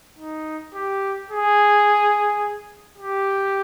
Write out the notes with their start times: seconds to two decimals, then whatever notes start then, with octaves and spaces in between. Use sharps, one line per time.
0.19 D#4
0.75 G4
1.31 G#4
2.98 G4